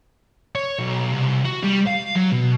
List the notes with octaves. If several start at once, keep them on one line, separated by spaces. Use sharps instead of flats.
C#5
B1
C2
F#4
G3
F5
F#3
B2